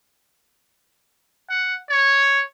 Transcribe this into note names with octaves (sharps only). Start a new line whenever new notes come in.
F#5
C#5